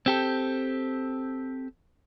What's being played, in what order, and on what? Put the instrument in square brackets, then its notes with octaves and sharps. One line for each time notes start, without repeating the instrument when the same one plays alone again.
[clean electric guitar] C4 G4 A4